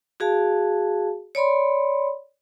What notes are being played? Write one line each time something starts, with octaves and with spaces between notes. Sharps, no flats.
F#4 G#4 F5 A5
C#5 D5 B5 C6